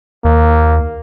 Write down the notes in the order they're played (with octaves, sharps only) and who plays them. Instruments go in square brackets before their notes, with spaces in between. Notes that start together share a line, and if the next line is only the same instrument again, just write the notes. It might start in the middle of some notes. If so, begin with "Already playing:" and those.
[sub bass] D#2 [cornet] A#3